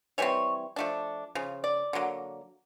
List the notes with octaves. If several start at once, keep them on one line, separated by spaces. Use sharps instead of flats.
E3 G3 C4 C#5
F3 A3 D4
C#3 F3
D5
D3 F#3 A#3